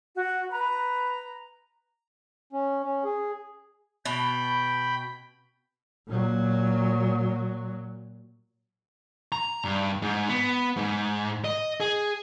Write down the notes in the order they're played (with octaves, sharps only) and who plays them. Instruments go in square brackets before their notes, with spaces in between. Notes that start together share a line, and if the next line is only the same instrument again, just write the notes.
[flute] F#4
[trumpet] B4 [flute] A#5
[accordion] C#4
C#4
G#4
[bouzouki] B2 [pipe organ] G5 B5
[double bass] A#2 F#3
[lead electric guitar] A#5
G2
G#2
B3
G#2
D#5
G#4